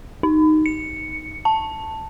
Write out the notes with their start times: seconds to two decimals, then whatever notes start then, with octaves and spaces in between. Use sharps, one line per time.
0.23 D#4
0.66 C#7
1.45 A5